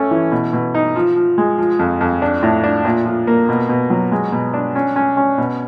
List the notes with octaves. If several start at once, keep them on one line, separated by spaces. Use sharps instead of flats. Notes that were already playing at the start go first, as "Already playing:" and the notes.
Already playing: A3 C#4
E3
B2
B2
D#4
F3
F3
G#3
F3
F2
F2
D4
A2
D4
A#2
F3
A#3
B2
B2
F#3
G#3
B2
D4
C#4
C#4
C#4
B2